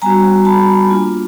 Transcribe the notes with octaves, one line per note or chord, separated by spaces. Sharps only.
G3 B3 D4 F#4 G#5 A#5
A5 B5
A#3 D4 F4